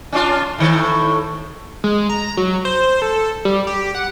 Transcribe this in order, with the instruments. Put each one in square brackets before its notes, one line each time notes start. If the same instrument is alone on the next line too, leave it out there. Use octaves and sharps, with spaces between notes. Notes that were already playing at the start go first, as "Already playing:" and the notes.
[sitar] C#4 D4 F4
A2 D#3
[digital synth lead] G#3
A#5
F#3
C5
A4
G3
G4
F#5